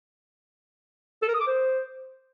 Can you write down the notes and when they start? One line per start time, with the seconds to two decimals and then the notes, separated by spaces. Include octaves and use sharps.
1.22 A4
1.28 A#4
1.34 D#6
1.41 D6
1.47 C5